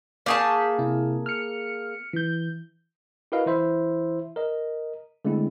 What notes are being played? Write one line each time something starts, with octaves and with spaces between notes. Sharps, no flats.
A#3 G#4 A5 C#6 G6 B6
C3 E4
F6 C#7
E3 G6
E4 F#4 A#4 B4 D#5 F5
E3 E4 C5 E5
A#4 D#5
D3 G#3 A3 C4 E4